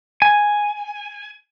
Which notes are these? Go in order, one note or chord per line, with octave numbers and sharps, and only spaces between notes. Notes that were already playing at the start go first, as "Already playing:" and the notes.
G#5